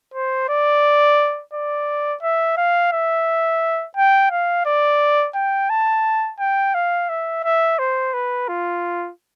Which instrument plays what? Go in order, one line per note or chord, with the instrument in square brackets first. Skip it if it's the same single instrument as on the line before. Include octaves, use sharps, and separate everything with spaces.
[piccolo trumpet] C5
D5
D5
E5
F5
E5
G5
F5
D5
G5
A5
G5
F5
E5
E5
C5
B4
F4